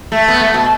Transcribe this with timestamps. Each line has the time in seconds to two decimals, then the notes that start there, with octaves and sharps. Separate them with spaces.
0.12 A3
0.28 B3
0.41 A3
0.54 B2